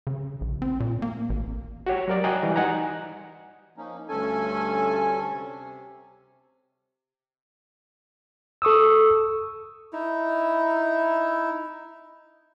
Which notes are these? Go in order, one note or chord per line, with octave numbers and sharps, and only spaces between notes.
C#3
A#1
C4
A#2
A#3
A1
F#4 G4 C#5
F#3 A#4 D5
F#4 D#5 G5 G#5 A#5 F#6
E3 G3
D#4 F#5 G#5 A#5
F3 A#3 C#4 D#4
D2 G2 C#4 A4 G#5
C3
A4 C#6 D#6 E6
D#4 E4